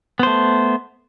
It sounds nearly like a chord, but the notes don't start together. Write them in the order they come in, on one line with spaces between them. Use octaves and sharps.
B3 C5 A3